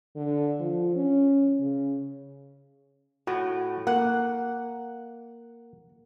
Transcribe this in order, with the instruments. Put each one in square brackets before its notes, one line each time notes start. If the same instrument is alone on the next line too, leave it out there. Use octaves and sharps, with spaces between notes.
[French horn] D3
F3
C#4
C#3
[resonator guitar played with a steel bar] A2 [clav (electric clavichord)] F#4
[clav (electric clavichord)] A#3 [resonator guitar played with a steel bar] F#5